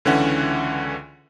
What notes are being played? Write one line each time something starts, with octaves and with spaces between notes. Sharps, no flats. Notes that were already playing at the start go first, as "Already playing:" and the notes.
C#2 D3 E3 C#4 E5 F#5